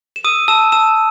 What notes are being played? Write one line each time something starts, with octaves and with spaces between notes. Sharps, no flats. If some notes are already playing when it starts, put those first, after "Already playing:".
E7
D#6 E6 D#7
A5 E6 E7
A5 E6 E7